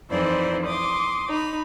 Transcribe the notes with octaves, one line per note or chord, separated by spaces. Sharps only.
F2 E3 D#4 E4 C5 D5
C6 D6 D#6
D#4 B5